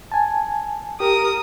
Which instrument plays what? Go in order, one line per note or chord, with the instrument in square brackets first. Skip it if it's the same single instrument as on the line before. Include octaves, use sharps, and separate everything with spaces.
[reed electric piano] G#5 A5
[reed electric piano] G4 [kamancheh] A#4 D#6